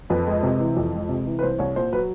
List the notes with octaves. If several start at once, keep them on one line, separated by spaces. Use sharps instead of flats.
F2 B4
G#3
C3
E3
F2
G#3
C3
E3
B4
C2 C5
C2 C#5
A#2 C5
F#3 B4